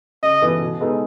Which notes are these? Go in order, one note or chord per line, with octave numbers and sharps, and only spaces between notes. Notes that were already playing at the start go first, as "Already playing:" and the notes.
C#3 D#5
E3 B3 E4 A4
B2
G#3 B3 D#4 A4